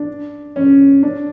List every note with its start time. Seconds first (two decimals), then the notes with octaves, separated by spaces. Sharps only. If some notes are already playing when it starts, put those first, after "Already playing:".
Already playing: D4
0.56 C#4
1.03 D4